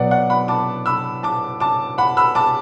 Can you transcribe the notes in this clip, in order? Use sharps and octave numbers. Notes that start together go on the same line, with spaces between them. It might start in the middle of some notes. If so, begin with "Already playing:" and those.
Already playing: B2 F#3 B3 D5 F#5
D5 F#5
F#5 B5
A5 D6
B5 E6
A5 D6
A5 D6
F#5 B5
B5 E6
A5 D6